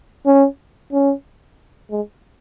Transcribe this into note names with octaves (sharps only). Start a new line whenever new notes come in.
C#4
C#4
G#3